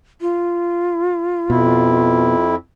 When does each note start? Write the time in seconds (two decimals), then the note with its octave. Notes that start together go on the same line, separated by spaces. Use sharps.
0.21 F4
1.50 F2 B2 E4